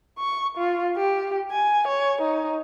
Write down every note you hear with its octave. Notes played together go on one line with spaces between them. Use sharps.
C#6
F4
G4
G#5
C#5
D#4